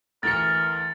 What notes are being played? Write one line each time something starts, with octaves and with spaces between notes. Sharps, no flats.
D2 E3 A#4 A6 C#7